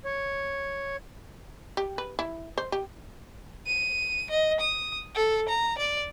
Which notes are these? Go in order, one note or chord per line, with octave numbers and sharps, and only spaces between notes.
C#5
G4
B4
E4
C5
G4
D#7
D#5
D#6
A4
A#5
D5